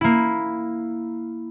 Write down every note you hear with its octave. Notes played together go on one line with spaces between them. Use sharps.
A#3 E4